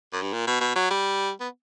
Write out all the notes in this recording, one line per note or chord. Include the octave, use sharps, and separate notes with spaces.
F#2
G2
A#2
B2
B2
F#3
G3
B3